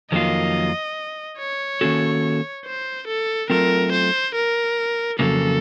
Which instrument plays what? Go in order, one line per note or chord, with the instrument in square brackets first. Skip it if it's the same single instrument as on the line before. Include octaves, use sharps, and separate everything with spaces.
[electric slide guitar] F2 D#3 F#3 A#3 F4 [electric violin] D#5
[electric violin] C#5
[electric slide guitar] D#3 A#3 C#4 F#4 A4
[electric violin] C5
A4
[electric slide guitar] F#3 A3 C4 F4 A4 [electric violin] A#4
[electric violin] C5
A#4
[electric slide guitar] F2 C#3 F#3 A#3 [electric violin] A4